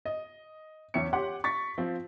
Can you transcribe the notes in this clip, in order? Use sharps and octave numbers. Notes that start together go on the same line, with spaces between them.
D#5
E2 C#4 C#5 E5 C#7
G4 C#5 F#5 C6 D6
C#6 A6 B6
F3 C4